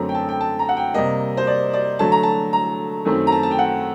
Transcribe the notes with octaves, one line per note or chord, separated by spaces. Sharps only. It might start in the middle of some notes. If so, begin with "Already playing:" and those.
Already playing: F#2 D3 F#3 A3 C4 A#5
G5
A5
G5
A5
A#5
F#5
G5
C3 G3 A#3 D#5
C5
D5
D5
D3 F#3 A3 A5
A#5
A5
A#5
F#2 D#3 A3 C4
A#5
A5
A5
G5
F#5